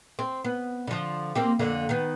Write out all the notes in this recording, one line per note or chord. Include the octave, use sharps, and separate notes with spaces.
C4
B3
D3 F3
A#3 C4 G4
F2 D3 A#3
D#3 B3